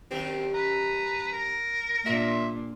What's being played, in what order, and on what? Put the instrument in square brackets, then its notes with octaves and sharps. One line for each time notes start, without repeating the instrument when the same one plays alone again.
[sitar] F#2 D#3 G4 [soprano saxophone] C4
[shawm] B4 [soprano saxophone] A#5
[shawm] A#4
[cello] A#2 D4 [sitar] F4 [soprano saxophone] E5